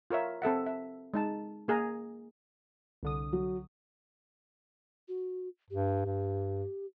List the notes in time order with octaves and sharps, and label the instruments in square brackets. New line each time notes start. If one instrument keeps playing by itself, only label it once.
[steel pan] F4 A#4 C#5 E5
C4 A4 E5 F#5
E5
G#3 D#4 A5
A#3 G#4 G#5 A#5
[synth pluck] C2 D3 D#6
[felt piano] F#3
[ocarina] F#4
[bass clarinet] G2 [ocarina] G4
[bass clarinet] G2